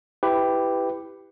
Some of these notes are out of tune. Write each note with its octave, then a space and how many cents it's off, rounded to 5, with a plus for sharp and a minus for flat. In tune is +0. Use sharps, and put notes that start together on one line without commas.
E4 +0 G4 +0 B4 +15